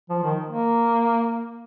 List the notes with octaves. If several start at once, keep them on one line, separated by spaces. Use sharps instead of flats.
F3
D#3
A#3